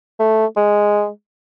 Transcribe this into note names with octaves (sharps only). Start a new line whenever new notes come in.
A3
G#3